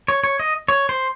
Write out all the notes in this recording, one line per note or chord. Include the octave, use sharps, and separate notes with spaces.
C#5
C#5
D#5
C#5
C5